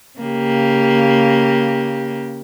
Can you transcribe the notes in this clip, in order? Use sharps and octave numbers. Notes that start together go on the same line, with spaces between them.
C#3 A#3 G4